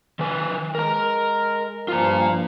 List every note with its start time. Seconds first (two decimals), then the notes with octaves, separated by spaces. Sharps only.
0.19 D#3 B4
0.75 G#3 A#4 A#5
1.88 G2 F3 F4 A#5